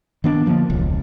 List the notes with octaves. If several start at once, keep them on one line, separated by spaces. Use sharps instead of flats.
D#3 B3 D4
D3 F3 A#3
E1 C#2